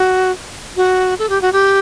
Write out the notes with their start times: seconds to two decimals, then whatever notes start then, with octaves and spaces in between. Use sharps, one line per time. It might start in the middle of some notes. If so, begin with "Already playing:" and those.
Already playing: F#4
0.77 F#4
1.19 A4
1.29 G4
1.42 F#4
1.53 G4